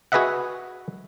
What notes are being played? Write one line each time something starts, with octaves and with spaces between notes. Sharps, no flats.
F#4 G#4 B4 D#5 E5 F#5